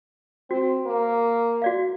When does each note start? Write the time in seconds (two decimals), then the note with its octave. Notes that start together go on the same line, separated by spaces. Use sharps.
0.51 C4 F#4
0.86 A#3
1.62 F#4 D5 F5